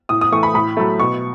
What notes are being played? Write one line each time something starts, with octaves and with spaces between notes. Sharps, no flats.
A2 D#6
D#6
E3 A3 C#6
B5
A2 B5
F#3 A3
B2 C#6